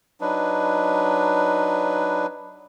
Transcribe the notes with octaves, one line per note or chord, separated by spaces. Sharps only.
F#3 D4 D#4 B4